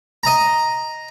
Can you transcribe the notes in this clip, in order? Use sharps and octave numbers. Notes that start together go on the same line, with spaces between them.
D#5 A#5